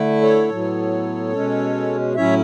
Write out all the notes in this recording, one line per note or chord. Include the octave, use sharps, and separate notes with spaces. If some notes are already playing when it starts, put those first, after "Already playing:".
Already playing: D3 A3 E4
A4 C#5
A2 F#3 B3
B2 G#3 C#4
A2 F#3 C#4 E4 C#5 E5